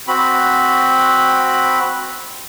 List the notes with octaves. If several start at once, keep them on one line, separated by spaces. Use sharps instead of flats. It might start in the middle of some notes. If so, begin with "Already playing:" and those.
C4 F#4 B5